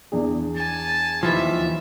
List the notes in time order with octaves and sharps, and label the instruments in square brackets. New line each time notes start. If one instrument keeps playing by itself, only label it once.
[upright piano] E2 D4 G#4
[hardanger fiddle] G#5 [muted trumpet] A5
[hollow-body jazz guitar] D#2 E3 F3 [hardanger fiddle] E5